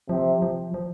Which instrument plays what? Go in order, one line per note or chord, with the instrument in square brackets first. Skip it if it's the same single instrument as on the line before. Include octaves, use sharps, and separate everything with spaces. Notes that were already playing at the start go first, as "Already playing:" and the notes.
[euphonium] C3 [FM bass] F3
[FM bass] F3
F3